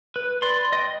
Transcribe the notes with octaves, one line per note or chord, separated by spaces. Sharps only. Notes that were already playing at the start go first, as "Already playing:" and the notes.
B4
D5 B5 C6
D#5 G5